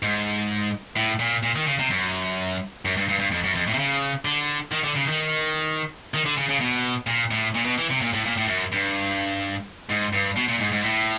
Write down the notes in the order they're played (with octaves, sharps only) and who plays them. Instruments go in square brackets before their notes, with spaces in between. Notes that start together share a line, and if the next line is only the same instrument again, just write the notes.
[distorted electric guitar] G#2
A2
A#2
A#2
D#3
C#3
C3
F#2
F#2
G2
G2
G2
F2
F#2
F2
A2
C3
C#3
D3
D#3
D3
C#3
D#3
D#3
D3
C#3
C#3
B2
A#2
A2
A#2
B2
E3
C3
A#2
A2
A#2
A2
F#2
G2
G#2
G2
B2
A#2
G#2
G#2
A2